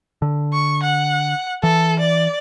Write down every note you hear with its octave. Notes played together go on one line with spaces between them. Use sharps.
D3
C#6
F#5
E3 A4
D5